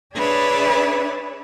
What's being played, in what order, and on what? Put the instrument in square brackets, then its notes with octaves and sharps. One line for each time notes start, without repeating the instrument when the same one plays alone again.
[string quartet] D4 G#4 B4 C#5 D5 E5